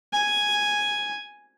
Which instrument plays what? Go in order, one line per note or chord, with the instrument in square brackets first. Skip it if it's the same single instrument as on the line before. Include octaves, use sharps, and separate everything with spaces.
[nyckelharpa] G#5